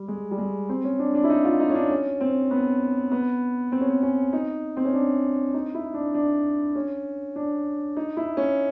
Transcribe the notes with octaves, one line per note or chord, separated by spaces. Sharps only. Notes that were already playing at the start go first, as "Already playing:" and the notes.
Already playing: G3
G#3
G3
G#3
C4
C#4
D4
D4
E4
D#4
F4
D#4
C#4
D4
C#4
C4
B3
B3
C4
C#4
C4
C#4
D#4
C4
C#4
D4
D#4
E4
D4
D4
C#4
D4
D#4
E4
C#4